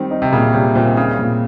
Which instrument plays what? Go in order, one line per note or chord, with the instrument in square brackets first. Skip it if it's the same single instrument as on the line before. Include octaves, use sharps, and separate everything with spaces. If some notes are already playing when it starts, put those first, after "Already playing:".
Already playing: [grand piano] D#3 [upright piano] G3 C4
[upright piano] D#4
[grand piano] C3
[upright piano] A#2 [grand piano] C#3
[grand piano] C3 [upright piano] G3
[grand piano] A#2 [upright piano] C4
[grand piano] C#3 [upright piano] D#4
[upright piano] A#2